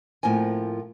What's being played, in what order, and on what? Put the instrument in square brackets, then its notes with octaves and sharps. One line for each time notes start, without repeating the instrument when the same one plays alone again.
[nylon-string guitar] A2 F3 A#3 C4 G#5